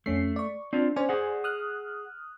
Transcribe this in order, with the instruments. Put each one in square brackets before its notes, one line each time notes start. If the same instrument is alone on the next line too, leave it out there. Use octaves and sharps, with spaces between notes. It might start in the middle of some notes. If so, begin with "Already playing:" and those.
[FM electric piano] F2 C#4 C7 [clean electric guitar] A3
[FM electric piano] D5 C#6
[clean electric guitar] C4 F4 [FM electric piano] D4
[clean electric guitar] C#4 [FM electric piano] C5 D5 G#5
[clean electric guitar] G#4 F#5
[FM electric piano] D#6 F6 F#6